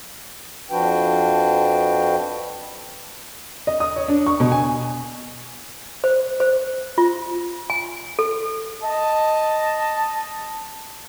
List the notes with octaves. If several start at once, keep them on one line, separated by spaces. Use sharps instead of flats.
F2 F3 D4 F#4 B4 G5
D#5
D#6
C#5
D4
C#6
B2
G#5
C5
C5
F4
G#5
A4
D#5 A5